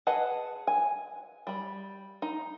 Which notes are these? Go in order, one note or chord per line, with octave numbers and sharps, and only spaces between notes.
G#4 B4 D#5 F#5 A5
G#5
G3 B5
D#4